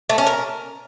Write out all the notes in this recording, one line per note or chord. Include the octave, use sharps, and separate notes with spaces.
A3
C#4
A#4